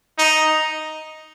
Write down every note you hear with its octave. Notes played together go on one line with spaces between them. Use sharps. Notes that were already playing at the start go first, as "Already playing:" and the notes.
D#4